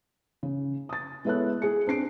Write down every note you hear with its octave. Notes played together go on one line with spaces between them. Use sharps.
C#3
D#6 A6
G#3 B3 E4 A4 C#5 F#6
G#4 G#5 C#7
C4 D4 C7 D7